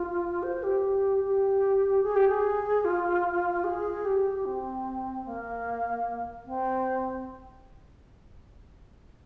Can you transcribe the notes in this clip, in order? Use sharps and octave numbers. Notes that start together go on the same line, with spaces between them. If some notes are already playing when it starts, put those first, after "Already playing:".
Already playing: F4
C5
G4
G4
G#4
G4
G#4
F4
G#4
G4
C4
A#3
C4